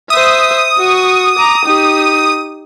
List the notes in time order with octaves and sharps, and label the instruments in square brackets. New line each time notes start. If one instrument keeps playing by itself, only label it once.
[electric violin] C5 E5 [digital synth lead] D#6
[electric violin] F#4 C#6
A#5 D6
D#4 G4